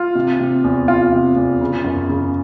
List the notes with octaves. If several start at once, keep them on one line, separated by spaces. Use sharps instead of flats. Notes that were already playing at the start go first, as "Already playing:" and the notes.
Already playing: F4
C3
C3
E2
E2 F4
C3
E2
C#3
F#2
C#3